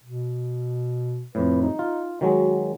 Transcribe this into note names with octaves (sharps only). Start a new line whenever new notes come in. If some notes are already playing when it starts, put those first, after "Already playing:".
B2
F2 A2 B4
D#4
F4
D#3 F#3 G#3 F#4